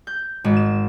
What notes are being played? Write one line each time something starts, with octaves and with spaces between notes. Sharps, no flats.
G6
G#1
E7